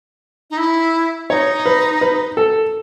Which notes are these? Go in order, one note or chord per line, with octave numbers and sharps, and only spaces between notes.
D#4
E4
D#4 C#5
B4
B4
A4